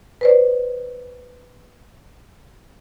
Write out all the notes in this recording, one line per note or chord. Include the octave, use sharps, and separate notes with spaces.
B4 C5 D5